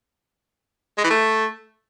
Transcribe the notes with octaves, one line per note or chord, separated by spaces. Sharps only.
G#3
E3
A3